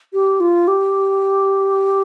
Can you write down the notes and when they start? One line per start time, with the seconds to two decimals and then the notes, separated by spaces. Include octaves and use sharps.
0.14 G4
0.40 F4
0.68 G4